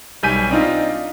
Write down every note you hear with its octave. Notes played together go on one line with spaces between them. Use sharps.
B1 G3 G#5 G6 B6 D#7
C4 D4 D#4 F4